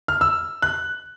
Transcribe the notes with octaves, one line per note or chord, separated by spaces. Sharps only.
F6
E6
F#6